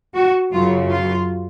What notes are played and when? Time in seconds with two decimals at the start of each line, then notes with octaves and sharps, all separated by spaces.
0.16 F#4
0.52 F#2 C#3 F#3 F4
0.89 F4